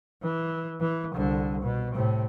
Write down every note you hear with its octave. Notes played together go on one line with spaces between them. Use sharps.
E3
E3
C2 D3
B2
A2 C3